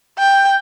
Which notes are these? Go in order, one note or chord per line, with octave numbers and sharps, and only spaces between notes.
G5